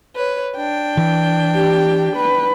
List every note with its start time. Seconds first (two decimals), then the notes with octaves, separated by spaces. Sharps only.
0.16 B4 C#5
0.56 D4 G5
0.97 E3
1.56 G4
2.17 B4